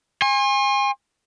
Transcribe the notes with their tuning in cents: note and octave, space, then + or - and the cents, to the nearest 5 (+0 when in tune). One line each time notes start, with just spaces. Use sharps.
G#5 -30 C6 +40